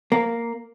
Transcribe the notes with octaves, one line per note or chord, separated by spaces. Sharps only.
A#3